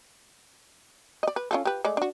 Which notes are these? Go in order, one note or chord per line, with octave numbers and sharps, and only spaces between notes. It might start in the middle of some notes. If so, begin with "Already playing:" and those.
D5 D#5
B4
C#4 F4 A4
G4 B4
G#3 A3 D5
D4 F#4